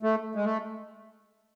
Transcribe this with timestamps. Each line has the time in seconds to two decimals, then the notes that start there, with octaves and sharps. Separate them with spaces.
0.03 A3
0.35 G#3
0.45 A3